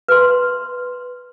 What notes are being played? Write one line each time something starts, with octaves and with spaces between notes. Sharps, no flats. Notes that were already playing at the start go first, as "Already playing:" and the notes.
B4 C6